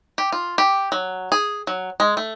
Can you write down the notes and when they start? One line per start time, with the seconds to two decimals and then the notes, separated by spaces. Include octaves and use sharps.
0.18 G4
0.32 F4
0.58 G4
0.92 F#3
1.32 G#4
1.67 F#3
2.00 G#3
2.17 A3